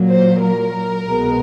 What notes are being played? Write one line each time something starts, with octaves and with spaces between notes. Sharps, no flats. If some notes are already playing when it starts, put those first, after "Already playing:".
Already playing: A#2 F#3 A#3
C5
A#4
C2 B2 G#3 B3